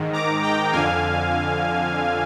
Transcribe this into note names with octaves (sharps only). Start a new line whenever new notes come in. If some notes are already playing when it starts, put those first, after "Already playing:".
Already playing: G#2 D#3
A#5 D6
G5 A#5
F2 D3 F5 G#5